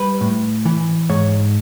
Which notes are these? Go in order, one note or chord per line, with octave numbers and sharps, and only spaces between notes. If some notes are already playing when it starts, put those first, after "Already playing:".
Already playing: G3 B4
A2
E3
G#2 C#5